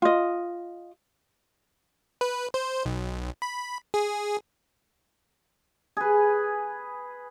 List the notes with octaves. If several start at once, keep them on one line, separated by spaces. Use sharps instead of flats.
F4 D#5
B4
C5
B1
B5
G#4
G#4 B4